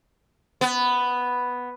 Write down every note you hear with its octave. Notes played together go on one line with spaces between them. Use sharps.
B3